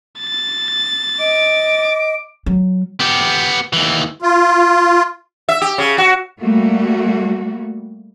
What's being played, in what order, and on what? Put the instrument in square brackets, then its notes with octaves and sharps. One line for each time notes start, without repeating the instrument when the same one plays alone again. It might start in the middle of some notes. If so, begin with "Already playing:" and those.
[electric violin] A6
[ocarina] D#5 [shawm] D6
[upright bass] F#3
[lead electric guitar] B3 G4
D#2 E3
[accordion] F4
[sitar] E5
G4
C#3
F#4
[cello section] G3 A3 A#3 F#4